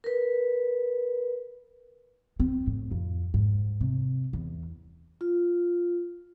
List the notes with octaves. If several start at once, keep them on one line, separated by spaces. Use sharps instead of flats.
A#4 B4
C4
A2
F2
G#2
C3
E2
F4